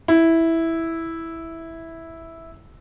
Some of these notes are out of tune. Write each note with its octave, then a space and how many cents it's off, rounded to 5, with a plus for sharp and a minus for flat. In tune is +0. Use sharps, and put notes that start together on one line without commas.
E4 -5